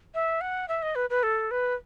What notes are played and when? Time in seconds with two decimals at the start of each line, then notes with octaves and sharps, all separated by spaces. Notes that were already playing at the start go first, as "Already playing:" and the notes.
0.14 E5
0.41 F#5
0.68 E5
0.82 D#5
0.95 B4
1.10 B4
1.23 A4
1.51 B4